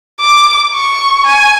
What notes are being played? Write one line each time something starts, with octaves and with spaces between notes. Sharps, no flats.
D6
C#6
G#5